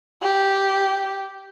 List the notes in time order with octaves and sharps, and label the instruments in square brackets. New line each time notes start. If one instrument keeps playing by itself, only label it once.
[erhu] G4